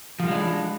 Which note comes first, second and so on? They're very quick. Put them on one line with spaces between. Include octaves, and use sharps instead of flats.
F3 G3 G#3 D4 E3